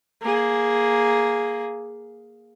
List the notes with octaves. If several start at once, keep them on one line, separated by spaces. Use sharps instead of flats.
A#3 G#4